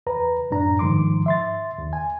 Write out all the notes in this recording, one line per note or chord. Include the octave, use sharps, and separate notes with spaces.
E2 B4 A#5
F#2 A2 D4 A#5
G#2 D#3 F3 C6 D6
E5 C6 A6
D#2
G#5